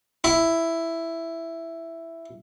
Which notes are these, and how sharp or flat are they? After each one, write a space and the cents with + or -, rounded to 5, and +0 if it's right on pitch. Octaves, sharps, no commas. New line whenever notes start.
E4 +5